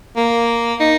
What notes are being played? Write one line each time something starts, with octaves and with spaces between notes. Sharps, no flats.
A#3
D#4